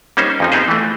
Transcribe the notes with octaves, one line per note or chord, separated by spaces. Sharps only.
G3 A#3 C#4 D#4 C5
F2 F3 D#4
B3 C4 D#4 G4 G#4 C5
E3 A3